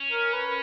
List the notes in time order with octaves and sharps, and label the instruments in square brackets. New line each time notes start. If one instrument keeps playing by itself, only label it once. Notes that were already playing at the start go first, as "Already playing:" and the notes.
Already playing: [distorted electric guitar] C#4
[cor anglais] A#4
B4